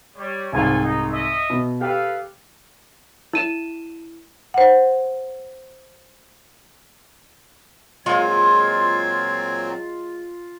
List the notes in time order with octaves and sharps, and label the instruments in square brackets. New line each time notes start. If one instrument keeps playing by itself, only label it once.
[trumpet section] G3 C#5
[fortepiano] C2 G#2 F5 [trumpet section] C4 A4 G#5
[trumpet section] D#4
D#5 E5
[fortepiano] B2
[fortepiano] G4 G5 [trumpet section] A4 B4 F5
[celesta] E4 D#7 E7
[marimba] C5 F#5
[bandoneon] A#2 F#3 C4 [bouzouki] G#3 [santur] F4 [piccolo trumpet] G#6